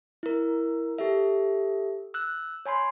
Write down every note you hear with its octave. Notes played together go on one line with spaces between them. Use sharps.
E4 A#4
G4 A4 E5
E6 F#6
C#5 G#5 B5 C6